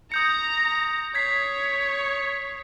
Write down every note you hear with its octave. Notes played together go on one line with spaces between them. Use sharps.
A#5 D#6 G6 C#7
C#5 G#6 B6 C7